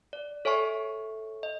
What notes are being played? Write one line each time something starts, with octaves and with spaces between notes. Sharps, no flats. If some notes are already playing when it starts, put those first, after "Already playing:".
D5
A4 C#5 E5 G#5 C#6
D#5